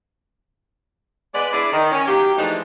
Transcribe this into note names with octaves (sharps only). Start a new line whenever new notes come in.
G#3 B3 B4 D5
D4 E4 G#4 D5
D#3
C#4
D#3 F#3 A#3 G4
E3 F3 G#3 A3 D4 D#4